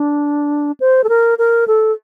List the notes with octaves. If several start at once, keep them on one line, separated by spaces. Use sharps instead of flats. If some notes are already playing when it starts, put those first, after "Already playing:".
Already playing: D4
C5
A4
A#4
A#4
A4